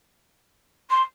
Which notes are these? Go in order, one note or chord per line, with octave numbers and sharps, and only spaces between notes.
C6